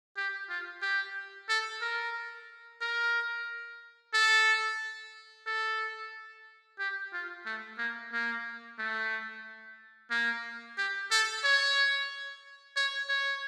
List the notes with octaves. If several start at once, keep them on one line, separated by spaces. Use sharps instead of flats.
G4
F4
G4
A4
A#4
A#4
A4
A4
G4
F4
A3
A#3
A#3
A3
A#3
G4
A4
C#5
C#5
C#5